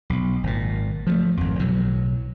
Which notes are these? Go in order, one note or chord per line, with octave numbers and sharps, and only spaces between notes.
B1
G#1 A#2
F3 G3 A3
G#1 F2
B1 A2 F#3